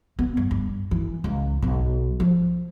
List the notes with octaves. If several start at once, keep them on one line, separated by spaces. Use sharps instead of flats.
B3
G2
G2
E3
C#2
B1
F3